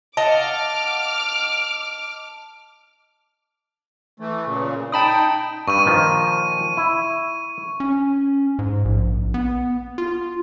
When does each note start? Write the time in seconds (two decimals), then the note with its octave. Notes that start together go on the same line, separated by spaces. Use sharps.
0.17 D#5 F5 F#5 A5 D6 F6
4.20 E3 A3
4.46 A#2 C#3
4.92 D#4 G5 A5 B5 D#6
5.68 G2 C#6 D#7
5.85 A#2 D#3 F3
6.77 E4
7.80 C#4
8.59 G#2
8.85 A#1
9.34 B3
9.98 F4